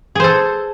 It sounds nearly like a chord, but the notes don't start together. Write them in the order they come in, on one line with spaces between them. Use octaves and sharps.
G#4 C5 A4